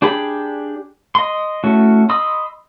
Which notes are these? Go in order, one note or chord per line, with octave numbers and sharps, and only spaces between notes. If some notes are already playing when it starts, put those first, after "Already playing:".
D4 G4 G#4 B5
D#5 C6
A3 C#4 E4 F#4
D#5 B5 C6 D#6 E6